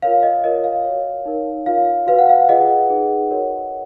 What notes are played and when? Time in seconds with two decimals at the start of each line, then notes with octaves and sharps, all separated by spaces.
0.02 F4 A#4 C#5 F5
0.23 D#5
0.44 F4 A#4 C#5 D#5
0.64 F5
0.85 F#4 C#5
1.25 D#4 A#4 C#5
1.66 F4 A#4 C#5 F5
2.07 F#4 B4 F5
2.18 F#5
2.29 F5
2.49 F4 G#4 B4 D#5 F#5
2.89 D#4 G#4 B4
3.31 F#4 A#4 C#5